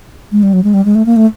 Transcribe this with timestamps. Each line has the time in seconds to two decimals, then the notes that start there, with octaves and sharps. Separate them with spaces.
0.32 G#3
0.43 G3
0.53 F#3
0.64 G#3
0.74 G3
0.85 G#3
0.95 A3
1.06 A#3
1.16 A3